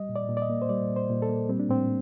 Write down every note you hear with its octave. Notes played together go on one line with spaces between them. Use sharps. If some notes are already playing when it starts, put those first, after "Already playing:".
Already playing: G3 D#5
A#2
D5
A#2
D5
D#5
A#3
C5
G3 D5
A#2
C5
A#2
A4
A#3
G3 C4
D4
A2 C4